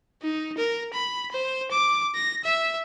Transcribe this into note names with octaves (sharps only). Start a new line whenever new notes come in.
D#4
A#4
B5
C5
D6
A#6
E5